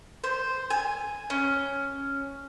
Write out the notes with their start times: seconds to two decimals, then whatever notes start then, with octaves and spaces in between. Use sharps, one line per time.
0.24 C5
0.70 G#5
1.30 C#4